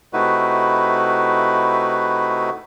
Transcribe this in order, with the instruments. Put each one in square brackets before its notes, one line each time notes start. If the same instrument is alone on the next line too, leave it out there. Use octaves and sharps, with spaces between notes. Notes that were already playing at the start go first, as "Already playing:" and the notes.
[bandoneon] C3 A3 D#4 E4 F#4 B4